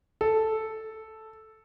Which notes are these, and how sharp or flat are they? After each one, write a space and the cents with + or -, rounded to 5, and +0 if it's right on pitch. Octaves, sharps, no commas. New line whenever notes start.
A4 -5